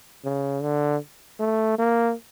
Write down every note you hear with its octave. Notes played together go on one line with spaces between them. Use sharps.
C#3
D3
A3
A#3